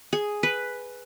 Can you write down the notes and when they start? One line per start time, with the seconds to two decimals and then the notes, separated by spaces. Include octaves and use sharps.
0.13 G#4
0.43 B4